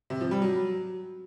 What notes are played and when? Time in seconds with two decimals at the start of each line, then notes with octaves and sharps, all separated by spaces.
0.10 C3
0.21 F3
0.31 G3
0.42 F#3